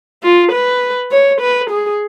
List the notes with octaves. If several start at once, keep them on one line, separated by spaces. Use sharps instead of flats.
F4
B4
C#5
B4
G#4